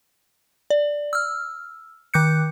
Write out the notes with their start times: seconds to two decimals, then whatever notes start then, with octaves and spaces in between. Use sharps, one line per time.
0.70 D5
1.13 E6 F6
2.14 D#3 D6 F#6 G6 C#7